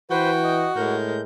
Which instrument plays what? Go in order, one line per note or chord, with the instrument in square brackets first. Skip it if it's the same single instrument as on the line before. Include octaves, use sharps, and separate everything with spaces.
[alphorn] E3 [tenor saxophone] F#4 [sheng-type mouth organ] B4 C5 [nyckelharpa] G5
[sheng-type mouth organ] D#5
[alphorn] A2 [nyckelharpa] G#3 A#4 [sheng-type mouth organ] G6